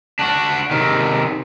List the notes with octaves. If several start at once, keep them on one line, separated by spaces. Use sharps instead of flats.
D4 F#4
C3 D#3